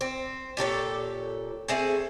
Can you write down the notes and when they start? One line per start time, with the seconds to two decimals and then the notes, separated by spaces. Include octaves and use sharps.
0.01 C4
0.57 A#2 G4 A4 C#5
1.68 A3 C4 G#4